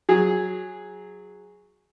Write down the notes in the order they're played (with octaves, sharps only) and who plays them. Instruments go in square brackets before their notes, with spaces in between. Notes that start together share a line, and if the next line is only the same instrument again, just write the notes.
[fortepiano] F#3 G#4